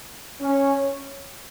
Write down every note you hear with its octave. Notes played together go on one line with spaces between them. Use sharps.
C#4